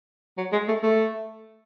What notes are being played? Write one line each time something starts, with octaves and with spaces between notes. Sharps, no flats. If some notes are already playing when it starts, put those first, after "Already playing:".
F#3
G#3
A3
A3